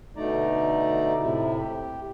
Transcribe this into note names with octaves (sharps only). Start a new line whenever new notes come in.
B2 D3 A3 D#4 D5 A#5
A2 C3 E4
G4